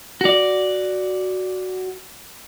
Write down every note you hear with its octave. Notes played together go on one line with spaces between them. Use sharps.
F#4 D5